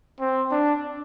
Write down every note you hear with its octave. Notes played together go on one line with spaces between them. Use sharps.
C4
D4